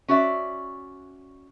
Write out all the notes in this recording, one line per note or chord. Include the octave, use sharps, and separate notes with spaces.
C#4 F#4 D5 E5